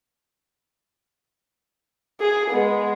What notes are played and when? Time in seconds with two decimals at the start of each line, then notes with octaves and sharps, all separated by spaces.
2.20 G#4
2.51 G#3 B3